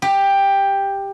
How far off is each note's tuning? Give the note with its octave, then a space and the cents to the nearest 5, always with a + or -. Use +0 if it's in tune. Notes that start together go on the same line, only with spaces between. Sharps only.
G4 +10